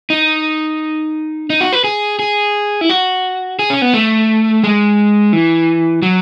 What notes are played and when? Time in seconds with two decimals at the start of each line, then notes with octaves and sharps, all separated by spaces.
0.10 D#4
1.50 D#4
1.61 F#4
1.73 B4
1.84 G#4
2.19 G#4
2.81 E4
2.90 F#4
3.59 G#4
3.70 C#4
3.82 B3
3.94 A3
4.64 G#3
5.33 E3
6.02 F#3